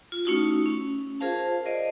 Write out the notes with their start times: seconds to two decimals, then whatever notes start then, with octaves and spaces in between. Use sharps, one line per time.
0.12 F4
0.25 A3 C#4 D#4 E4 F#4
0.66 C#4
1.20 F4 G#4 A#4 C5 F5 A5
1.65 A#4 C5 D5 D#5 F5